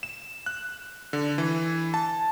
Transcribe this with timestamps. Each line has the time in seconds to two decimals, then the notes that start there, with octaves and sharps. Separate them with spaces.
0.03 E7
0.46 F#6
1.13 D3
1.38 E3
1.94 A5